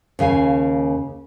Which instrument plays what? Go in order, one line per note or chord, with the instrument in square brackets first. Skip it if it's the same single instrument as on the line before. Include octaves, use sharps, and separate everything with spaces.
[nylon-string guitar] D#2 C#3 F5 G#5